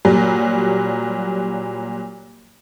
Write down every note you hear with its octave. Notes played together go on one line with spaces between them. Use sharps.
A#2 F#3 G3